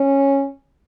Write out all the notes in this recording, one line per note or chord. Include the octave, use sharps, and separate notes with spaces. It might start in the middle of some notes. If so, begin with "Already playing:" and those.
Already playing: C#4